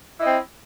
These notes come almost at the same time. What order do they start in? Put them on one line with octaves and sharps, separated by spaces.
E4 D#5 C4